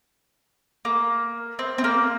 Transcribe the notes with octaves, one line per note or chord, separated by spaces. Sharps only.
A#3
C4
C4
A#3